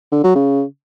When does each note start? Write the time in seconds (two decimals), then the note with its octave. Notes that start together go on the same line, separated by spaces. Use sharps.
0.12 D3
0.24 F#3
0.35 C#3